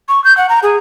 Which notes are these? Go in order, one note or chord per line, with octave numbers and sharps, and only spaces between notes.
C#6
G6
F#5
A#5
G#4